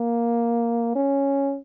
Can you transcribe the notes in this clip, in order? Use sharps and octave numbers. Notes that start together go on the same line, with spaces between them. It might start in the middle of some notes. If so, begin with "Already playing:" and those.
Already playing: A#3
C#4